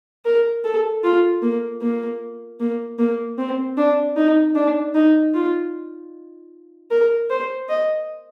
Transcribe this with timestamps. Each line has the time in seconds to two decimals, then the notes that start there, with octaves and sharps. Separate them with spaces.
0.25 A#4
0.64 A4
1.04 F4
1.42 A#3
1.82 A#3
2.60 A#3
2.99 A#3
3.38 C4
3.77 D4
4.17 D#4
4.56 D4
4.95 D#4
5.34 F4
6.91 A#4
7.30 C5
7.69 D#5